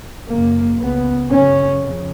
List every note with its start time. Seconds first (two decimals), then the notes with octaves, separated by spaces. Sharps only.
0.29 F#2 C#3 A#3
0.79 C#2 C#3 B3
1.31 F#2 C#3 C#4
1.82 F2 C#3